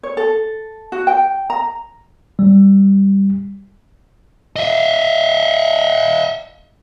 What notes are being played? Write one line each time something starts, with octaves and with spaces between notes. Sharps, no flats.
C#5
A4
F#4
G5
A#5
G3
D#5 E5